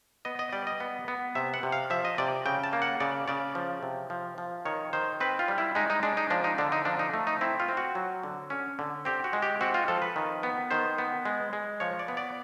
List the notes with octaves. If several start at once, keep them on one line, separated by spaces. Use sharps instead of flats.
B3 D#5
D#5
G3 D5
D#5
B3
B3
C3 E5
F#5
C3
F5
F3 E5
D#5
C3 D5
C#3 G5
A5
A#3
F#5
C#3 D5
C#3 D5
F3
C3
F3
F3
D#3 C#5
D#3 C5
C4 B4
F4
G3
E4
G#3 D#4
D#4
G#3 D4
D#4
F3 D4
D#4
D3 D4
D#4
F3 D4
D#4
A3
D#4
C4 E4
F4
C4
F#4
F#3
D3
C#4
D3
C4 G4
F#4
G#3
G4
C4 F#4
F4
F3 A4
B4
D#3
B3
D#3 C5
B3
G#3
G#3
F3 C#5
D5
B3
D5